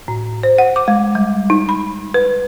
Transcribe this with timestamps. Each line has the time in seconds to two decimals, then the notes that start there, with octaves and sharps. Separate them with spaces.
0.08 A2
0.43 C5
0.58 F#5
0.76 D6
0.88 G#3
1.15 G3
1.50 D#4
1.69 B5
2.14 B4